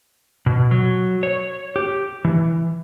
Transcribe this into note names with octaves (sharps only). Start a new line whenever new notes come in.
B2
F#3
C#5
G4
E3